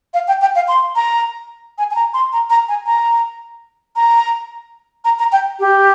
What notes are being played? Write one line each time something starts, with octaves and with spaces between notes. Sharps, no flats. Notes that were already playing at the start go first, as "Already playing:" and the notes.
F5
G5
G5
F5
C6
A#5
G#5
G#5
A#5
C6
A#5
A#5
G#5
A#5
A#5
A#5
A#5
G5
G4